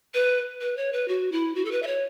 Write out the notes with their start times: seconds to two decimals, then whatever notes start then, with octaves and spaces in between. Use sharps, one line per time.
0.14 B4
0.61 B4
0.77 C#5
0.93 B4
1.08 F#4
1.32 E4
1.55 F#4
1.65 A4
1.71 B4
1.82 E5
1.87 C#5